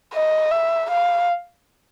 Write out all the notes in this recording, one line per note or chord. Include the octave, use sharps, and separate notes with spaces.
D#5
E5
F5